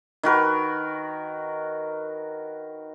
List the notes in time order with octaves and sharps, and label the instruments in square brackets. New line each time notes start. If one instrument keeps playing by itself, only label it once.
[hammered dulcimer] D#3 F#4 A#4 B4